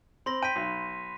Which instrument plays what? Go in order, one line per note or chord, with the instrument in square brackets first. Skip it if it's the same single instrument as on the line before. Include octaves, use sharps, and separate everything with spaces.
[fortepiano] C4 [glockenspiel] B5 C6 A#6
[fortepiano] G5 [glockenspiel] B6 D#7
[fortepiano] B1